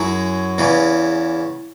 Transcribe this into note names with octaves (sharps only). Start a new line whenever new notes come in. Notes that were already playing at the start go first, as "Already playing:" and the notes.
Already playing: F#2 F#3 E4 G#4
E2 C#3 E3